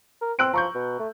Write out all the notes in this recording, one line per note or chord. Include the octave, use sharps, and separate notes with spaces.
A#4
C4 E6 F#6 D7
F3 A#5 C#6 G6
B2
A3